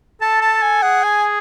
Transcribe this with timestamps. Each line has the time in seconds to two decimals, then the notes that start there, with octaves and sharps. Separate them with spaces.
0.22 A4 A5
0.41 A5
0.62 G#5
0.82 G#4 F#5
1.03 G#5